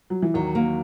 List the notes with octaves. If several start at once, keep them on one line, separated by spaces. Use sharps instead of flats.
F#3
E3
D#2 D#3 F#3
A#3